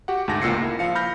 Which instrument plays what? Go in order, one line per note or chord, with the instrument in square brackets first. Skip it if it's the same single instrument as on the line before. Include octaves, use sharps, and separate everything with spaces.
[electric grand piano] F#4 G4 F#5
D2 G#2 A5 A#6
C#2 A#2 E6 A#6 C7 C#7
A#3 E4
F3 F5 C#7
B5 F6 G6 A#6